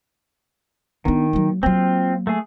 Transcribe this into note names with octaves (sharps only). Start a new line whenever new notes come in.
D#3 B3 D4
F#3 A#3
F#3 A#3 C4 F4
A3 G#4